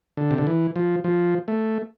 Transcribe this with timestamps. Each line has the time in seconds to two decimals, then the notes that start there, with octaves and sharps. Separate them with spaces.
0.17 D3
0.31 C3
0.38 D3
0.47 E3
0.76 F3
1.04 F3
1.48 A3